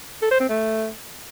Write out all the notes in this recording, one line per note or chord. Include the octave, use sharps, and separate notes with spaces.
A4
C5
C4
A3